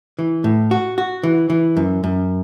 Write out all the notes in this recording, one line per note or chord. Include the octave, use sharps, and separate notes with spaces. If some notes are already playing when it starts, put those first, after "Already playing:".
E3
A2
F#4
F#4
E3
E3
F#2
F#2